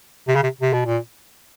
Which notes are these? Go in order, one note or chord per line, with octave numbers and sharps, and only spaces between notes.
C3
C#3
C3
C3
B2
A#2